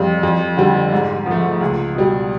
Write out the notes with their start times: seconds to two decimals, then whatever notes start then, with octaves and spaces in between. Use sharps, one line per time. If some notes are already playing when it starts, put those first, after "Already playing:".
Already playing: F2 G3
0.23 F2
0.57 D3 G3
0.92 G#2
1.26 F3
1.31 A3
1.61 C#2
1.95 B2 G3